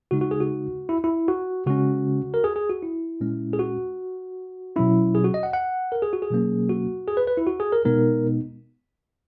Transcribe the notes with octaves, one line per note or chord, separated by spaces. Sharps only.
C#3 G#3 D#4 F#4
F#4
G#4
F#4
E4
E4
F#4
C#3 G#3 C#4 F#4
A#4
G#4
G#4
F#4
E4
A#2 G#3 C#4
G#4
F#4
B2 F#3 C#4 E4
G#4
F#4
D#5
F#5
F#5
A#4
G#4
F#4
G#4
B2 F#3 A#3 C#4
F#4
G#4
B4
B4
E4
F#4
G#4
A#4
B2 G#3 B3 D#4 A#4